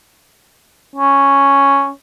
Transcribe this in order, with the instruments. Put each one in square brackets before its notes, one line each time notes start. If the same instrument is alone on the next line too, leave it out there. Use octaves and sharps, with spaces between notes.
[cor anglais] C#4